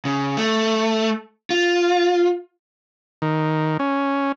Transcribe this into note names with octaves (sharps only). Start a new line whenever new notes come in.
C#3
A3
F4
D#3
C#4